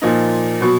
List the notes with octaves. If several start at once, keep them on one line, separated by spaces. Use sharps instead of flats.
A#2 F3 A#3 D#4
B2 F#3